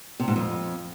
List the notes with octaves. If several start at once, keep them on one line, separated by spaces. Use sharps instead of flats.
C3
G#2
F2